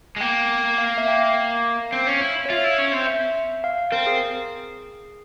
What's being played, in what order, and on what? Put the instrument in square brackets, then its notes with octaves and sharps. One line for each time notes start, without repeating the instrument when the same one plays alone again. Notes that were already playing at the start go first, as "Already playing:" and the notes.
[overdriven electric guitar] G#3
[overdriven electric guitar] A#3 [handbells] G5
[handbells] F5
E5
G5
F5
[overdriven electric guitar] C4
C#4
E4
[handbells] C#5
[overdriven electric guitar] F4 [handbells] E5
[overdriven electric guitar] E4
C#4
C4
[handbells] E5
F5
F5
[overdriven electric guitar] C4 [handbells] A#4
[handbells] G#4